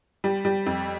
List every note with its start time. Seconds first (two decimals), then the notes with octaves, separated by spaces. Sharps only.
0.24 G3
0.45 G3
0.66 F2